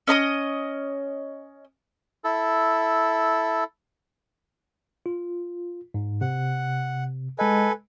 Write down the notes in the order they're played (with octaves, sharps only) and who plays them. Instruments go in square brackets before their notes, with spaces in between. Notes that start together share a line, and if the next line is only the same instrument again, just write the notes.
[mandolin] C#4 D#5 A#5 D#6
[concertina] E4 A4
[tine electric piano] F4
G#2
[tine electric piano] C3 [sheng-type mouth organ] F#5
[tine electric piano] G#3 D#5 [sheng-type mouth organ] A4 B4 G#5